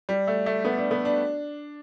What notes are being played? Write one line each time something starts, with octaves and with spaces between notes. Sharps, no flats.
G3
A3
A3
B3
D4
B3
D4